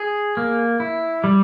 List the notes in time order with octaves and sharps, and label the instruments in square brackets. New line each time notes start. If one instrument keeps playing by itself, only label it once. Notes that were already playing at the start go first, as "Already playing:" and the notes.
Already playing: [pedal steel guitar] G#4
A#3
E4
G3